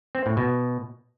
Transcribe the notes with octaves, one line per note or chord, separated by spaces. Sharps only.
C4
A2
B2